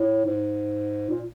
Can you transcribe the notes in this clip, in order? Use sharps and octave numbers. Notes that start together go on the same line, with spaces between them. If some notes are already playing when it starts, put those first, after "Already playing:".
Already playing: A2
G#2
A#2